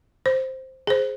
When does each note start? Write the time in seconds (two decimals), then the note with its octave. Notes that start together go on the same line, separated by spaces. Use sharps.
0.26 C5
0.87 G#4 C5